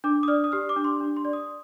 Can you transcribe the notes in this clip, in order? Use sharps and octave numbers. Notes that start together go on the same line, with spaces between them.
D4 D6
D#6
D5 F6
D#6
G4 F6
D6
D4
C6
D4
C6
D5
D#6